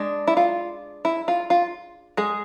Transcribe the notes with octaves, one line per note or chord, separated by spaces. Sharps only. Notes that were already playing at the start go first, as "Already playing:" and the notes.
Already playing: G#3 D4
E4
F4
E4
F4
F4
G#3 G#4